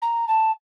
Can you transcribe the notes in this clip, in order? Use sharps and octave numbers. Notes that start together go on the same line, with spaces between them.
A#5
A5